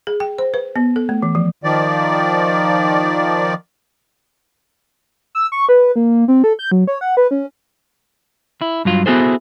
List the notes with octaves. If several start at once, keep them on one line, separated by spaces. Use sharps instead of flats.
G#4
G5
C5
B4
B3
A4
A3
E3
F3
D#3 F3 D5
E6
C#6
B4
A#3
C4
A4
G6
F#3
C#5
F#5
B4
C#4
E4
G2 F#3 F4
B3 E4 F#4 G#4 A4 C5